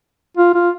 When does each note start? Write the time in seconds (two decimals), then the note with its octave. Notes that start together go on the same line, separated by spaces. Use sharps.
0.37 F4
0.54 F4